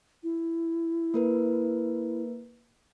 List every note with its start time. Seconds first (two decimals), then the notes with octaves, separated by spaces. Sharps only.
0.23 E4
1.14 A#3 A#4 B4